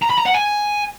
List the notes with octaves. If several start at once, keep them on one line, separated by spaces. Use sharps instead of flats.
A#5
B5
A#5
F#5
G#5